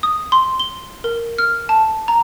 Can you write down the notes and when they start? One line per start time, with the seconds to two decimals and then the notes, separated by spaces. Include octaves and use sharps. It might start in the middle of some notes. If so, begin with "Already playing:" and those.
0.03 D#6
0.32 C6
0.60 G7
1.04 A#4
1.38 F6
1.69 A5
2.08 A#5